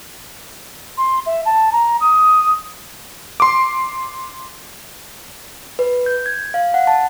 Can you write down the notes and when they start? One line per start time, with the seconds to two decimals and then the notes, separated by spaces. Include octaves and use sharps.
0.97 C6
1.26 E5
1.45 A5
1.72 A#5
2.00 D#6
3.40 C6 D6
5.79 B4
6.06 G6
6.26 G#6
6.54 F5
6.74 F#5
6.87 A5